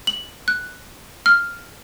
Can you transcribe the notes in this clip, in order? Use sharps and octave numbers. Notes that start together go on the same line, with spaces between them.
F#7
F#6
F6